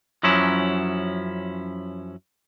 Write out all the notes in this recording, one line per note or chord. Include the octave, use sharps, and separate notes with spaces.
F#2 F3 F#3 C#4 E4